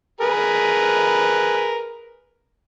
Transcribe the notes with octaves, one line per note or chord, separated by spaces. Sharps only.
G#4 A#4 B4